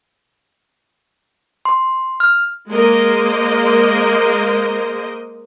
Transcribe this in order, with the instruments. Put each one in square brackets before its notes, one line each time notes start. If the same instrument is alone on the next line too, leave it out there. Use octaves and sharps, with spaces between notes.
[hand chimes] C6
F6
[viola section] G#3 A#3 A#4 C5 D#5